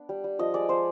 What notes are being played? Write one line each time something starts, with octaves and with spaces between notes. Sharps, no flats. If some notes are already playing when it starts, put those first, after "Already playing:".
Already playing: B3 D4
G3
G3
F3 D#5
G#3 D5
F3 C5